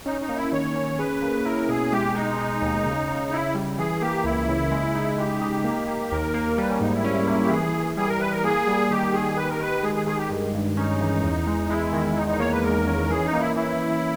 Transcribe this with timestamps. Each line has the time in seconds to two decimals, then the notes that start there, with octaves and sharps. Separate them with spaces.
0.06 C#4 D#4
0.21 D#4
0.28 A#3
0.36 E4
0.52 D#3 C#5
0.75 C#4
0.99 G#4 B4
1.22 A#3
1.45 E4 A#4
1.68 B2 G#4
1.92 G#3 G4
2.15 G#3 D#4
2.38 G#3
2.61 D#2
2.85 C#3
3.08 C#3
3.31 C#3 E4
3.55 G3
3.78 E3 G#4
4.01 A#3 G4
4.24 C#2 E4
4.48 C#3
4.71 G#3
4.95 D#4
5.18 G#3 G4
5.41 D#4
5.64 A#3
5.88 A#3
6.10 D#2 A#4
6.34 A#3
6.58 G3 B4
6.69 C#4
6.80 G#2 D#4
6.93 E4
7.04 C#4
7.27 A#3
7.44 G4
7.50 E3 G#4
7.74 E3
7.97 G3 G#4
8.09 A#4
8.20 E3 B4
8.32 A#4
8.43 A#3 G#4
8.67 G3
8.91 D#3 G4
9.13 D#3 G#4
9.37 G4 B4
9.50 A#4
9.60 D#3 B4
9.83 G#3 G#4
9.95 G#4
10.06 D#3 G#4
10.18 G4
10.29 G2
10.54 G2
10.77 C#4 D#4
11.01 E3
11.23 E2
11.47 G#3
11.69 G#3 E4
11.93 D#3
12.16 E2 D#4
12.28 D#4
12.39 A#3 C#5
12.52 B4
12.63 E2 A#4
12.87 C#4
13.10 E3 G#4
13.25 D#4
13.33 A#3
13.40 E4
13.55 E3 E4